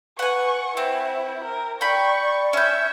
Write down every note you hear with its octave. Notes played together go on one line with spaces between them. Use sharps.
B4 F#5 G#5 C#6
C4 E4 C5
A#4
D5 G5 B5 C#6
C#4 E5 G6